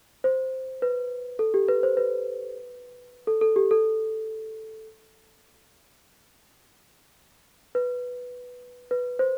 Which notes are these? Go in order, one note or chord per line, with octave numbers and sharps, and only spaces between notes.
C5
B4
A4
G4
B4
C5
B4
A4
A4
G4
A4
B4
B4
C5